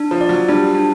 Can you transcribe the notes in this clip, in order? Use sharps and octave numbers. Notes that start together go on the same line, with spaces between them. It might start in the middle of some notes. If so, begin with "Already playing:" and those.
Already playing: D4
F3
D5
F#3
G3 D4
D4